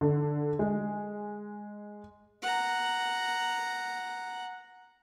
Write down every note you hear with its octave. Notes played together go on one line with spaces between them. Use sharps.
D3
G#3
F#5 A#5